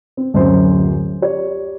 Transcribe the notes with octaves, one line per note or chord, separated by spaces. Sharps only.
C4
D1 F#2 C#4 C5
G4 C#5 D5